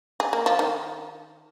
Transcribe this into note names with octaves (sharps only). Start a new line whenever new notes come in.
G#4
A#3
F3
D#3